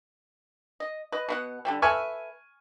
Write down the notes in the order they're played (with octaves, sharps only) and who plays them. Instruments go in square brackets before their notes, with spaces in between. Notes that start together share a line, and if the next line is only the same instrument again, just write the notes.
[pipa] D#5
B4 D#5
B2 B3 F#5
D3 G3 C4
[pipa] A4 B4 E5 [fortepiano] G#5 C#6 F6